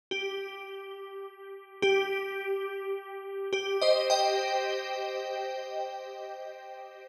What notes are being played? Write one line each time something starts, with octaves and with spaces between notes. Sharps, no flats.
G4
G4
G4
C5 D#5
D#5 G5